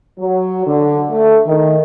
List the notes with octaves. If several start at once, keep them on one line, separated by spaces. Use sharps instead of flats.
F#3
D3
A3
D#3